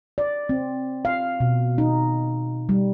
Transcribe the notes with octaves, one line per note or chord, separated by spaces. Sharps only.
D5
C4
F5
B2
D#4
G3